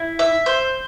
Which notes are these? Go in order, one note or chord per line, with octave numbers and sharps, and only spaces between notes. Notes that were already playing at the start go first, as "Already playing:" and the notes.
Already playing: E4
E5
C5